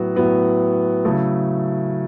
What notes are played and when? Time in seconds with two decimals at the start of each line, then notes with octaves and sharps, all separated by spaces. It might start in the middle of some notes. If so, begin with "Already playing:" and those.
Already playing: A2 F#3 B3 F#4
0.15 A2 F#3 B3 F#4
1.04 C#3 F#3 A3 E4 A4